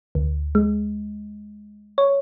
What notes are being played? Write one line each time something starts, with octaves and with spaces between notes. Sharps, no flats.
D2
G#3
C#5